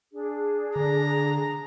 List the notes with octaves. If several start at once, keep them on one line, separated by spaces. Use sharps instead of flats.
D4 G#4
D3 A#5